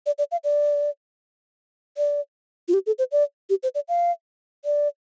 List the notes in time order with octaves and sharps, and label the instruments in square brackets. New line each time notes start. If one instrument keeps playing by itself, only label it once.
[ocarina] D5
D5
F5
D5
D5
F4
G4
A4
C5
D5
G4
C5
D5
F5
D5